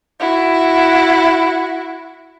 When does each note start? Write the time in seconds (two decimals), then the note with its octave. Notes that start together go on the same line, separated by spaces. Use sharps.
0.20 E4 F#4